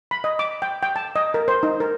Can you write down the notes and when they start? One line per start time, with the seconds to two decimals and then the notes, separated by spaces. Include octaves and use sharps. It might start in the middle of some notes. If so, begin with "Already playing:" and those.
0.11 B5
0.24 D#5
0.39 D6
0.62 G5
0.83 G5
0.96 A5
1.16 D#5
1.34 A#4
1.48 C5
1.63 D#4
1.80 A#4